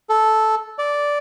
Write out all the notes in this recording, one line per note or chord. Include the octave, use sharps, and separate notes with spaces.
A4
D5